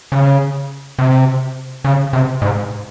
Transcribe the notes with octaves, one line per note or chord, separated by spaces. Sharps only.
C#3
C3
C#3
C3
G#2